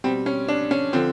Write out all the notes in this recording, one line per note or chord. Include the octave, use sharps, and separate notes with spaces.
B2 G3 C4
C#4
D4
C#4
D3 F3 C4